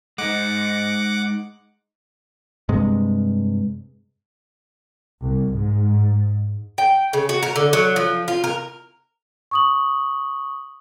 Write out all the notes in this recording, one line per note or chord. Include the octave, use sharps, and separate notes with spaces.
G#3 D#4 F#5 D6
G2 C3 G#3
C2
G#2
G5
C#3
F#4
A#4
D3
F#3
F3
F4
A#4
C#6 D#6 F#7